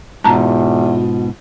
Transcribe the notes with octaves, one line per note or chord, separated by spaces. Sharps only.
E2 G#2 B2 F4 A5 A#5